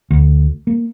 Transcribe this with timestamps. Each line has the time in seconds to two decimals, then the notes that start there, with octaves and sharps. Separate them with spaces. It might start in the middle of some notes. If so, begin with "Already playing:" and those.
0.11 D2
0.67 A#3